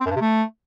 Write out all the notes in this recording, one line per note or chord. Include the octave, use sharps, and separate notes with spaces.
C4
F#2
G2
C3
A3